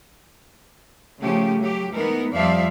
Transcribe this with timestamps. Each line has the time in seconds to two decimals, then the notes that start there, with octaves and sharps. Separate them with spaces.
1.22 C#3 F3 A3 C#4 G4
1.59 F#3 G4
1.93 E3 G#3 B3 D#4 A#4
2.33 F2 F3 G3 D5 E5 F5